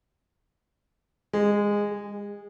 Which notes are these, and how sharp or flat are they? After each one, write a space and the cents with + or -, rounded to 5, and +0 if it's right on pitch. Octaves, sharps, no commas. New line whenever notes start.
G#3 -15
G#3 -35